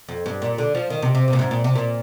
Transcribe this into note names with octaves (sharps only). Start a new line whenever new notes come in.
F2
G2
A#2
D3
F3
D#3
C3
C3
C3
A#2
G#2
A#2
C3
A#2